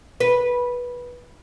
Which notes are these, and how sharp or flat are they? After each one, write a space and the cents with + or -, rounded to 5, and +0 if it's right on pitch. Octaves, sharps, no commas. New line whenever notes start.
B4 -15